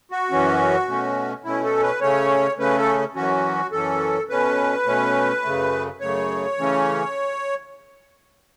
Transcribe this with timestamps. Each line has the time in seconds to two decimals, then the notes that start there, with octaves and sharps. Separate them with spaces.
0.12 F#4
0.31 F#2 E3 C#4
0.88 B2 A3 C#4
1.44 B2 A3 C#4 E4
1.64 A4
1.83 B4
2.01 C#3 A3 C#4 C#5
2.59 C#3 A3 C#4 B4
2.78 A4
3.15 F#2 E3 C#4 F#4
3.72 F#2 E3 C#4 A4
4.29 B2 A3 C#4 B4
4.86 B2 A3 C#4
5.43 F#2 C#3 A3
6.00 F#2 C#3 A3 C#5
6.58 C#3 E3 A3 C#4